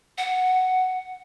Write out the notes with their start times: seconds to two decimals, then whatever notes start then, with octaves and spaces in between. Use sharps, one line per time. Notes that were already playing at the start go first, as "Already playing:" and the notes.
0.18 F#5